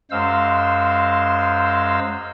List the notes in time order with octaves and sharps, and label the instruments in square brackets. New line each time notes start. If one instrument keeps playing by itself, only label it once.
[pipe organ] F#2 G#3 C5 F5 E6